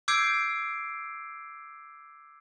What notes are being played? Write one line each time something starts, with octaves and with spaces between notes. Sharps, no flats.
D6 E6 G6 G#6 C7 D7